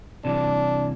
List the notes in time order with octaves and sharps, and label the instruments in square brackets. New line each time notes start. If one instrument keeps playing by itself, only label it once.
[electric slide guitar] C3 E3 G3 [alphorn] D4